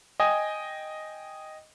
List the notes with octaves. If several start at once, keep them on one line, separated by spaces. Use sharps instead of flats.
D#5 G5 G#5 D#6